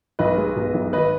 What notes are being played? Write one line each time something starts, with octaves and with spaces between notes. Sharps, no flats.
B1 B4 D#5
G#3
B2
B1
G#1 B4 D#5